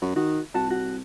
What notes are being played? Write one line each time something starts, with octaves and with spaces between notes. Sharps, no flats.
F#2 F#4
D#3 F#4
C2 F#4 A5
F#4